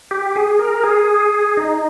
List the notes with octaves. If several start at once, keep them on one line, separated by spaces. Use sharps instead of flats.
G4
G#4
A#4
G#4
D#4